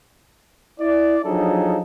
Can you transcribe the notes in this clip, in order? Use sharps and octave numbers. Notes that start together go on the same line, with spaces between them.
E4 D5
F3 F#3 D4 D#4 G#4 A4